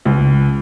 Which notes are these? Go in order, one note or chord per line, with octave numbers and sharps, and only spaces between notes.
C#2